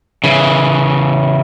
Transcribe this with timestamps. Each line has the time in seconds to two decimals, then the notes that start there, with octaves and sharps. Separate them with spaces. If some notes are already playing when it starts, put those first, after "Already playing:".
0.24 C#3 E3